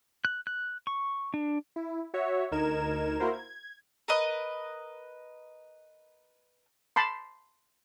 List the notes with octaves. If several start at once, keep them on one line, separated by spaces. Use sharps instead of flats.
F#6
F#6
C#6
D4
E4
F#4 C#5 E5
D2 D#4 A#4 G#6 E7
A#3 E4 F#4 A#4 C5
G#6
A#4 B4 D#5
A5 B5 C6